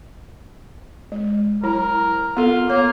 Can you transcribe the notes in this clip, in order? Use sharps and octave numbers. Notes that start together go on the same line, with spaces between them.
G#3
F#3 E4 A#4
B3 F4 A4
A#3 C#5